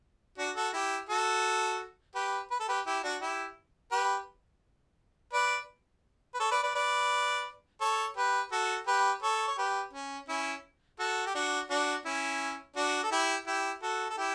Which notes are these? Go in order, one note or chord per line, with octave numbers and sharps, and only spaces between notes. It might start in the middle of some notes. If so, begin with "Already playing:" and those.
D4 F#4
F#4 A4
E4 G4
F#4 A4
G4 B4
B4
A4
G4 B4
E4 G4
D4 F#4
E4 G4
G4 B4
B4 D5
B4
A4 C#5
B4 D5
B4 D5
B4 D5
A4 C#5
G4 B4
F#4 A4
G4 B4
A4 C#5
C#5
G4 B4
C#4
C#4 E4
F#4 A4
G4
D4 F#4
D4 F#4
C#4 E4
D4 F#4
A4
E4 G4
E4 G4
F#4 A4
A4
E4 G4